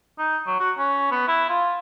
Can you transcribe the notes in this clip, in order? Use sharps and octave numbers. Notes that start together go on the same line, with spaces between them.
D#4
F#3
F#4
C#4
B3
E4
F4